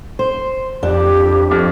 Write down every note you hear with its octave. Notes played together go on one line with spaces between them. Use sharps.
C5
F2 D4 G4
F2